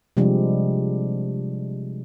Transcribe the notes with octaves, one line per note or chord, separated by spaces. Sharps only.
C3 F3 G3 G#3 D4